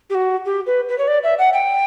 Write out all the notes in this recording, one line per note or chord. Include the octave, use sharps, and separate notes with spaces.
G4
F#4
G4
B4
B4
C#5
D5
E5
F#5
G5